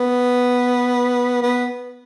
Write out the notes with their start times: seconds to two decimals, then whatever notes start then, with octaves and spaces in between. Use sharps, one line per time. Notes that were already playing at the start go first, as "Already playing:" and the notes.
Already playing: B3
1.43 B3